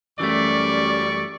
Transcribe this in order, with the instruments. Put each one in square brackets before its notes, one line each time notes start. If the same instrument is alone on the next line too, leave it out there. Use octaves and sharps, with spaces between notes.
[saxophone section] F#2 G3 [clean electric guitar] E3 A3 [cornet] D5 [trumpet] C#6